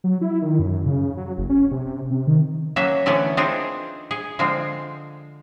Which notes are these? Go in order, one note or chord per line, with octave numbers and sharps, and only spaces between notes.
F#3
E4
D#3
F#2
C#3
F#3
F#1
C#4
C3
C3
D#3
F#3 A#3 C#4 C#5 E5
D3 E3 A3 B3 C#4 D5
C4 D4 D#4 F4 G#4 A#4
G#4
D3 F3 G#3 C4